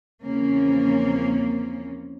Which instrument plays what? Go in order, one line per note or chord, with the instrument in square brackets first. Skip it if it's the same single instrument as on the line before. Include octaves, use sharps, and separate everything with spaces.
[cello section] E2 C#3 F3 A#3 C4 C#4